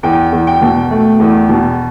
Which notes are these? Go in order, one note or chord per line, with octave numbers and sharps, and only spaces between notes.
E2 G5
E2
G5
B2
A3
E2
B2